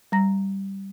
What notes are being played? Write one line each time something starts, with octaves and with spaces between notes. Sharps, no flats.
G3 A#5 A#6